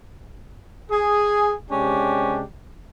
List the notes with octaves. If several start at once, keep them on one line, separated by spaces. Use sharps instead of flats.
G#4
C3 G#3 C#4 D4 G4